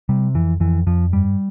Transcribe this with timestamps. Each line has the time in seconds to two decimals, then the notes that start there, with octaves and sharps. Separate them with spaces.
0.09 C3 G3
0.34 F2 E3
0.60 F2 E3
0.86 F2 F3
1.12 G2 G3